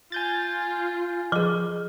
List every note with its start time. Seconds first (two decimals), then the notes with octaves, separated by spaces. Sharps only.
0.12 F4 G#5 G6 A6
1.32 F3 G#4 D6